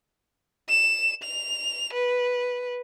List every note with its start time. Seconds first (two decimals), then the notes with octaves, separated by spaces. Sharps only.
0.69 E7
1.23 F7
1.93 B4